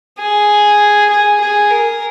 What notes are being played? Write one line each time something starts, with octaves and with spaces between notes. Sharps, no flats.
G#4
G#4
G#4
A#4